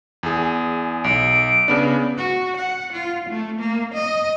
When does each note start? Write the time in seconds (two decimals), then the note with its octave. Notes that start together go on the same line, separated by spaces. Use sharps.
0.23 E2 G#4
1.04 B1 D7
1.68 C#3 B3 D4
2.17 F#4
2.57 F#5
2.93 F4
3.29 A3
3.60 A#3
3.94 D#5